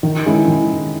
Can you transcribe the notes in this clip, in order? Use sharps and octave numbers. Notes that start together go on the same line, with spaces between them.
D#3
G#3 C#4 E4
D#3